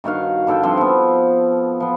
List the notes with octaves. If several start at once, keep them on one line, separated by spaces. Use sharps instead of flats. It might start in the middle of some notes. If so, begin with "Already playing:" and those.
G2 D#3 F#4 F5
G2 D3 A4 G5
G2 F3 C4 C6
F3 B3
F3 B3